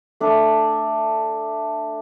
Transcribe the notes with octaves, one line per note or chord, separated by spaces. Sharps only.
A3 D4